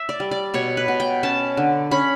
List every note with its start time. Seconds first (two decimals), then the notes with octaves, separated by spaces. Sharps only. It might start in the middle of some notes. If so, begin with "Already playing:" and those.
Already playing: E5
0.09 D5
0.20 G3
0.31 D5
0.54 B2 C#5
0.77 B4
0.88 B2
1.00 G5
1.23 C#4 A5
1.57 D3
1.91 C#4 B5